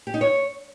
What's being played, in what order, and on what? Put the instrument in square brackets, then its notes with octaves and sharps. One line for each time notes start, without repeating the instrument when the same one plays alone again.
[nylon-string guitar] G4
D#4
C#5